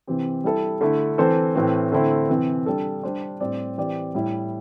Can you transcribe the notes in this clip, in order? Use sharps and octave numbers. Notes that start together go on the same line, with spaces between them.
C3 E3 C4 G4
G3 E4 A4
D3 A3 E4
E3 C4 A4 C5
A2 E3 A3 C4
D3 A3 C4 E4
C3 E3 C4
G3 D4 A4
G3 D4 C5
A2 G3 C4 G4 D5
E3 C4 G4 D5
A2 G3 E4